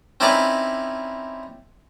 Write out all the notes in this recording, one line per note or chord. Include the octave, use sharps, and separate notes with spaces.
C4 C#4 D#4 E4 B4 D5